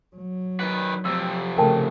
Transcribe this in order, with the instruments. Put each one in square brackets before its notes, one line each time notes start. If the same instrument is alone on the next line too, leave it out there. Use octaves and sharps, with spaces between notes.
[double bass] F#3
[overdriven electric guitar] D#3 B4
[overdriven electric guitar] F2 C3 [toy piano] E6
[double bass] C#3 A3 [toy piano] A#4 G5 A5